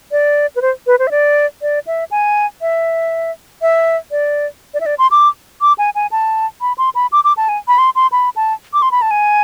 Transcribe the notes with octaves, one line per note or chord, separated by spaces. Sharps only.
D5
B4
C5
B4
C5
E5
D5
D5
E5
G#5
E5
E5
D5
D5
E5
D5
C6
D6
D6
G#5
G#5
A5
B5
C6
B5
D6
D6
A5
G#5
B5
C6
C6
B5
A5
D6
C6
B5
A5
G#5